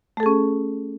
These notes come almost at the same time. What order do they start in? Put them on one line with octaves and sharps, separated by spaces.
A3 A4 G#4 C#4